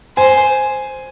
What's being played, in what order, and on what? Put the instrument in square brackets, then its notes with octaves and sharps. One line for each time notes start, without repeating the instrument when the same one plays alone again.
[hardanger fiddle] C5 [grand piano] G#5